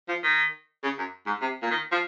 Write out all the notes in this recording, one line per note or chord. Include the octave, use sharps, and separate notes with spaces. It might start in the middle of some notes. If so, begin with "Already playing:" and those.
F3
D#3
C#3
F#2
G#2
C3
A#2
D#3
F3